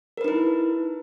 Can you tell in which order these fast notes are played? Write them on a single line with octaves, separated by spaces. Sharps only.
A#4 B4 D#4 E4